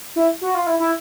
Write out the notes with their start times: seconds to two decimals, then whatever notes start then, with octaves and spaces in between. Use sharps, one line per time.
0.16 E4
0.41 F#4
0.55 F4
0.67 E4
0.79 E4